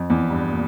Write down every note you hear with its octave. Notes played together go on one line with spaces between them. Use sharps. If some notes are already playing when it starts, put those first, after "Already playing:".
Already playing: F2
E2
G2
A#2